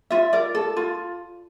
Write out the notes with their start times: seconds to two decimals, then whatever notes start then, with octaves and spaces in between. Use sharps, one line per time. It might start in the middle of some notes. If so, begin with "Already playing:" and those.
0.10 F4 E5
0.33 A#4 D5
0.55 A4
0.77 F4